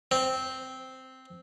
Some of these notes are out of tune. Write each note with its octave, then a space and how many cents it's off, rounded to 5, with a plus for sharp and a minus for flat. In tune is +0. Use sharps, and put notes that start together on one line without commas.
C4 -5